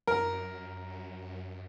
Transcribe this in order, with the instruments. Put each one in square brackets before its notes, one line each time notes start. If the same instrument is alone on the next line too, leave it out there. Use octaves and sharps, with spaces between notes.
[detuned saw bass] F#2 [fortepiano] A#4